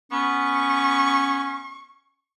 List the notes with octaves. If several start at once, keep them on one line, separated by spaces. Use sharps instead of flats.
B3 C#4 C#6